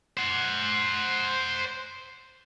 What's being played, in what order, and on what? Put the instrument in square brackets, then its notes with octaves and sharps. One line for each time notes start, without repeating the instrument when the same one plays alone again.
[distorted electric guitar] C5 F#5